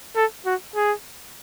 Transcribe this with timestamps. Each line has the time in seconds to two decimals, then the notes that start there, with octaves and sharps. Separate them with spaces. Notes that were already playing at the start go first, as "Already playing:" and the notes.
0.16 A4
0.46 F#4
0.76 G#4